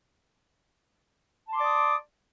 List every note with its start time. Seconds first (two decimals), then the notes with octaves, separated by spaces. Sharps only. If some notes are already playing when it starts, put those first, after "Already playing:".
1.48 A5
1.52 C6
1.56 D6
1.60 D5
1.64 D#6